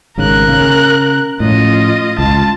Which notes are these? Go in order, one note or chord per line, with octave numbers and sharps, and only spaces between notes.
G#1 G#2 C#3 A#4 F#6
C#3 A#3
A2 F3 C#4 F4 D#5
C#2 F4 A5